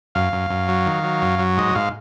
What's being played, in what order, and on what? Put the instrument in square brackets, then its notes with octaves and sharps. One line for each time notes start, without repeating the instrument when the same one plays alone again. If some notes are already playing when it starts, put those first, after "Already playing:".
[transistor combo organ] F#2 F5
F#2
F#2
F#3
D#3
F#3
F#2
F#3
G#2 D#5
G#2 F5